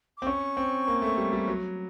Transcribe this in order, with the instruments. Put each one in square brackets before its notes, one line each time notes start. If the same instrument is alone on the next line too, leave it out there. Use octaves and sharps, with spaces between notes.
[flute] D6
[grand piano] C4
[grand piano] C#4 [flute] C#6
[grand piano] C4
A#3
A3
G3
G3
F#3